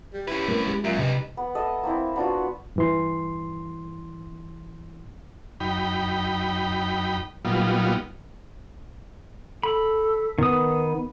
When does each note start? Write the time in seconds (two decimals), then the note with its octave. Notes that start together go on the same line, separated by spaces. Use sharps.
0.14 G3 G4
0.28 C#4 E4 B4
0.48 G3 A3 C4 A#4
0.67 G#3 G4
0.84 F#2 A#2 E5
0.99 G2 C3 D#4 B4 D#5
1.37 B3
1.55 A4 D#5 E5
1.83 A#3 C4 E4
2.16 B3 D4 F4 F#4
2.76 G2 E3 C6
5.60 F#2 D#4 G5 B5
7.45 A#2 F#3 G3 B3 D#4 F4
9.63 A4 B5
10.38 D#3 B3 D#6